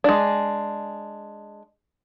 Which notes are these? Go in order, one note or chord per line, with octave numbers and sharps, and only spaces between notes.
G#3 D4